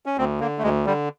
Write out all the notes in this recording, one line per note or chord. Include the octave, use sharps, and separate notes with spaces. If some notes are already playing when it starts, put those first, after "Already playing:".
C#4
D2 C4
D3 A#3
A3
D2 G#3
D3 G3